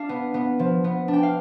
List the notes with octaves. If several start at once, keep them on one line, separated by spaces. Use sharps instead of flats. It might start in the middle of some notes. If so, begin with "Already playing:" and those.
Already playing: D4 F5
B3
B3
F3
B3
D4
G5
F5